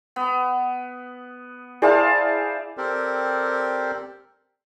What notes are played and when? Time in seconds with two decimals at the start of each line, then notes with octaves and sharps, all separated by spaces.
0.16 B3
1.82 E4 G#4 C5 D5 F5 A5
2.77 C4 G4 A4 A#4 C5 D5